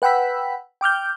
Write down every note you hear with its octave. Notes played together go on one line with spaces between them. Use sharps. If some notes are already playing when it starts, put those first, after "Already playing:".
B4 F#5 G5 B5 E6 B6
G5 D6 F6 G6